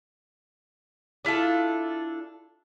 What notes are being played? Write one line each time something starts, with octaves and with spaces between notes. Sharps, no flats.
D4 E4 F4 A4